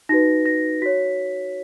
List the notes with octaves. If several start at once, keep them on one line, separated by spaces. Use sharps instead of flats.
D#4 F#4 B4 A#6
A#6
F#4 C#5 B6